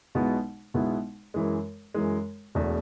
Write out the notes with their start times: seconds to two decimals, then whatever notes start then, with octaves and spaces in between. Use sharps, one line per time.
0.15 B1 B2 G#3 B3 E4
0.74 B1 B2 G#3 B3 E4
1.34 F#2 E3 G#3
1.94 F#2 E3 G#3
2.55 E1 E2 B2 A3